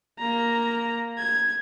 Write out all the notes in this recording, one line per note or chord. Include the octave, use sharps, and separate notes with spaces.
A#3 A#5
G#6